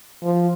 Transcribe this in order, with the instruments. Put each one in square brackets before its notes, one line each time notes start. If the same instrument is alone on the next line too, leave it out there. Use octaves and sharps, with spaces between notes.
[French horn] F3